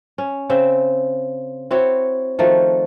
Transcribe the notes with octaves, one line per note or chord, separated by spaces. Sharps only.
C#4
C#3 C4 C5 E5
C4 E4 F#4 C#5
D#3 F3 A3 F#4